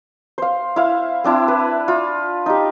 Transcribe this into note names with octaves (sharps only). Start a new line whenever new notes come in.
C5 F5
E4 F5
C4 D4 E4
B4
F4
D#4 G4